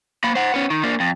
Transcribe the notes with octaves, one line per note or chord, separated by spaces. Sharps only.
A#3 B5
C5 F#5
B3 C#4
D#3
A#3 D4
F2